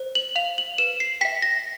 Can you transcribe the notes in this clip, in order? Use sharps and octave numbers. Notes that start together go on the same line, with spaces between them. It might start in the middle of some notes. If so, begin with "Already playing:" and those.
Already playing: C5
F#7
F5 F7
F#7
B4 E7
C7
E5 G5 B6
A#6